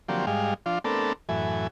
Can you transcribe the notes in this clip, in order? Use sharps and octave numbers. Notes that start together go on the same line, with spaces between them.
D3 F3 F#3 A#3 C4 G4
G#2 G3 G#3 F5
F3 D4 F4
A3 B3 C4 D4 A4 A#4
F#2 A2 E3 G#5